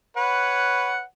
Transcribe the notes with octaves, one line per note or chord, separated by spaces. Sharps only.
B4 C#5 F#5